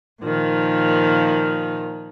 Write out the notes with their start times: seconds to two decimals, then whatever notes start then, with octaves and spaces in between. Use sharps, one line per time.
0.23 A#2 D#3 F3